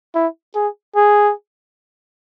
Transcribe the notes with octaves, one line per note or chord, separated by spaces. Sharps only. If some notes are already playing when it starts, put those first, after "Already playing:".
E4
G#4
G#4